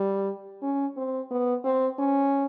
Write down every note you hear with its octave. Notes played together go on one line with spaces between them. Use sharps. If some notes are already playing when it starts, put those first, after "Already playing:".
Already playing: G3
C#4
C4
B3
C4
C#4